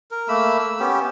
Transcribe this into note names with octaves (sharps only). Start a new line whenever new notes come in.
A#4
A3 A#3 B5 E6
E6
B3 C#4 G4